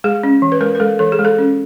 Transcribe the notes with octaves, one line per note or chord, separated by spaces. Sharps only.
G#3 G#4
C#4
E3
B4
G#3 A#4
A#4
G#3 A4
E3 A4
G#4
G#3
A4
C#4